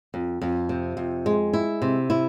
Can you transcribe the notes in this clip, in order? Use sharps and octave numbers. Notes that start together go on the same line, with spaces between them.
F2
F2
C3
F2
G#3
E4
C3
E4